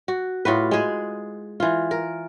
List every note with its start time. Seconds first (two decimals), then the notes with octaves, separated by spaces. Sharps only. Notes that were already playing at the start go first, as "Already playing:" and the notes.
0.08 F#4
0.45 A2 F4 F#4 B4
0.71 G#3 G#4
1.60 E3 F4
1.91 A#4